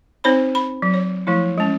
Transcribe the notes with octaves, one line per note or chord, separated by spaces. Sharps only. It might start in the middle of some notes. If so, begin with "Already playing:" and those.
C4 D#4 C5 C#5 B5
B5
F#3
C#5
F3 A3 E4
G#3 C#4